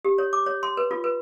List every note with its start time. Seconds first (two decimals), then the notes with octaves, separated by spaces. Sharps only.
0.05 G4
0.18 C#5
0.33 D6
0.46 C#5
0.63 C6
0.77 B4
0.91 F4
1.04 B4